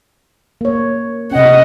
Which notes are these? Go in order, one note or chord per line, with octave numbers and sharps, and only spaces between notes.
A#3 C#5
C3 C#4 D#5 F#5